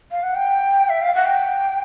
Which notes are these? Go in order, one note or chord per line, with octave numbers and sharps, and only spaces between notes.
F5
F#5
G5
E5
F5
F#5
G5